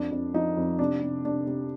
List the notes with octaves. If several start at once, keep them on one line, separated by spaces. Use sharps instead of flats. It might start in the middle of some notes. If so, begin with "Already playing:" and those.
Already playing: F2 D4
F2
F3 D#4
F2
C3 D4
C3
C3 D4
C3